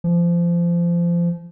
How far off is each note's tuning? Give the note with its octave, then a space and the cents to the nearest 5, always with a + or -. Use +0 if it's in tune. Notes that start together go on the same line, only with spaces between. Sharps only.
F3 -25